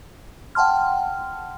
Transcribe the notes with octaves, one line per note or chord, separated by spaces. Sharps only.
F#5 G5 A5 C6 F6